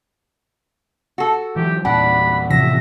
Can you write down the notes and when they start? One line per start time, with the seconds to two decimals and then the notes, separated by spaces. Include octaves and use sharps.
1.18 F#4 A4
1.56 E3 F#3 G4
1.85 E2 A#2 D4 F#5 B5
2.50 A2 C3 E3 F3 E5 A#6